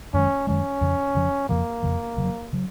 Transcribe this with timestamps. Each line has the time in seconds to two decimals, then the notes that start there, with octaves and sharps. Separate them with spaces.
0.14 F#2 D#3 G#3 C#4
0.47 F#2 D#3 G#3 C#4
0.81 F2 C#3 F3
1.15 F2 C#3 F3
1.49 F2 C#3 F3 A#3
1.83 F2 C#3 F3
2.17 F1 F2 C#3 F#3
2.53 C#3 F#3